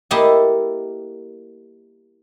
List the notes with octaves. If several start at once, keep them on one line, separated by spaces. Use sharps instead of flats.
A#3 E4 G4 A4 D#5 A5